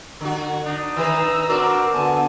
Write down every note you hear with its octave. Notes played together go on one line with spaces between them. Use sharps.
D3 F#4
D4 D#4
D#3 B4 A#5 E6
C4 D4 F#4 A#4 D5
D3 B3 G#5 A5